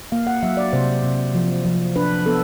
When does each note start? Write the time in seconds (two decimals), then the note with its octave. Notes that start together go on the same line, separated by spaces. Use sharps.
0.12 A#3 F5
0.27 F#5
0.43 F#3 E5
0.57 D5
0.73 C3 C5
1.04 C3
1.35 F3
1.65 F3
1.96 D4 B4
2.26 B3 A4